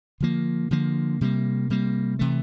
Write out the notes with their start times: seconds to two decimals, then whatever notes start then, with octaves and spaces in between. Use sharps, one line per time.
0.20 D3 F3 A#3
0.71 D3 F3 A#3
1.21 C3 G3 A#3
1.70 C3 G3 A#3
2.19 C3 E3 A3